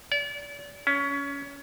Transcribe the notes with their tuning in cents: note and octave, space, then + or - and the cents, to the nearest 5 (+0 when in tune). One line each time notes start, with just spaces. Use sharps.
D5 -35
C#4 +20